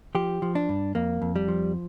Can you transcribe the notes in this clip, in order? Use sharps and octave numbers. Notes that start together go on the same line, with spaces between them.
F3 G4
F3
D4
G2
F2 A#3
F2
G3
F3